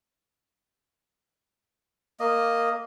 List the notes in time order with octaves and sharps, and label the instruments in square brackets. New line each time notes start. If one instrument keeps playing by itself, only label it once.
[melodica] A#3 D#5